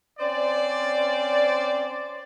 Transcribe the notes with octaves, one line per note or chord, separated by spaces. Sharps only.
C4 C#4 C5 D5